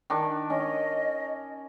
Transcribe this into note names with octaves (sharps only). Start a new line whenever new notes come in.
D#3 D4
C#4 D#5